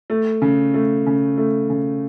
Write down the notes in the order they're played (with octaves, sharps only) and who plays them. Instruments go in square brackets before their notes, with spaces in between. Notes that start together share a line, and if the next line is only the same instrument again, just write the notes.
[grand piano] A3
C#3
A3
C#3
A3
C#3